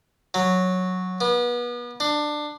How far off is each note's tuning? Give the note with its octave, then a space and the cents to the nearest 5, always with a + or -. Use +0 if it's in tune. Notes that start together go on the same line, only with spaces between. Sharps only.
F#3 -5
B3 -30
D4 +20